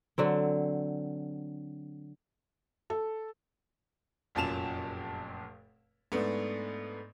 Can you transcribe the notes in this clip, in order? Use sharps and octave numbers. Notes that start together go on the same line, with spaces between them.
D3 F#3 C4
A4
F1 F#2 A#2 A5 E7 F7
G#2 A3 B3 D4